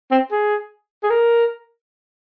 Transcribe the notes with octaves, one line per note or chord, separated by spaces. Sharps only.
C4
G#4
G#4
A#4